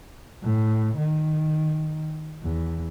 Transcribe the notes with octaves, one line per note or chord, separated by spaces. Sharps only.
A2
D#3
E2